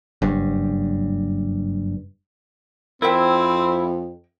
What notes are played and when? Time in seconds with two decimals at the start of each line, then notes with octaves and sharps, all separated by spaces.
0.22 F#1 G2
3.02 F2 C4 E4 A#4 E5 G5